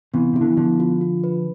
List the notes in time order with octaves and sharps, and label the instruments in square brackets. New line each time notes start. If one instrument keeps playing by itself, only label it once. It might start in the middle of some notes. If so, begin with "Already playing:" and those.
[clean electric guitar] C3 E3 [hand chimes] B3
[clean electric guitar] C3 [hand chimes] E4
[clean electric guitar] D3
E3
[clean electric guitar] D3 F3 [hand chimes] B3
[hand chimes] F4
F4
B4